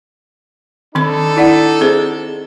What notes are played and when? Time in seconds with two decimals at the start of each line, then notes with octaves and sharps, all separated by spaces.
0.95 D#3 C4 D4 D#4 A4 B5
1.37 E4 D5 F#5
1.81 C4 G#4 C5